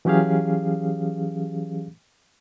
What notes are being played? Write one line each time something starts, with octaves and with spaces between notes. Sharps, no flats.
E3 F#3 C#4 G4 G#4 F5